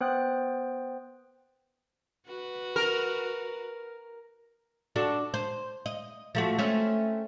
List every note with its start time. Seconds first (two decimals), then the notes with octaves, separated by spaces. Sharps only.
0.01 B3 C5 G5 D#6 F#6 A6
2.27 F#4 B4
2.76 A#4
4.96 D4 F#4 A4
5.34 C5
5.86 D#5
6.35 F3 A3 F#4
6.59 A3 C4 C#4